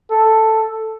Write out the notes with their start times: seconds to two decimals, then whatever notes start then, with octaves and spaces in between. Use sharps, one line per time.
0.11 A4